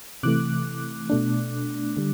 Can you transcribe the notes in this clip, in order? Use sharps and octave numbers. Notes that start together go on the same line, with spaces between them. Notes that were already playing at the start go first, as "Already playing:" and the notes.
C3 E3 A3 D6 F#6
B2 A3 D4
D3 G3